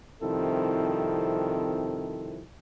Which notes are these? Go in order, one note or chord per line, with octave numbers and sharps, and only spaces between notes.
C2 D#3 F3 C4 E4 A4